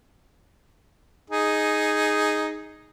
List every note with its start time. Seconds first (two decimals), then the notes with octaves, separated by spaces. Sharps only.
1.30 D#4 G#4